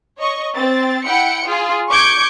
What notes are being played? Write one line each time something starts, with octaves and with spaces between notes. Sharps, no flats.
C#5 D#5 C#6
C4 A6
E4 F#5 G5 C#7
F4 G#4
C#6 D6 G6 G#6 C#7 D7